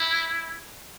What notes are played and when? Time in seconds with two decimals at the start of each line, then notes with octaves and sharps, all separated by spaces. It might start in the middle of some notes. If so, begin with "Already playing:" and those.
Already playing: E4